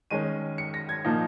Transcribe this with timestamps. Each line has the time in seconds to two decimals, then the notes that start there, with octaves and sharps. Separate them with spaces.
0.11 D#3 G#3 C#4 D#7
0.58 C#7
0.74 A#6
0.89 G#6
1.05 A#2 F3 A#3 D#4